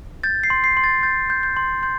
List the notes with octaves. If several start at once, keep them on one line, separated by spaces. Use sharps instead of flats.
G6 A6
C7
C6
C7
C6
A6
G6 A6
G6
G6
C6
C6 G6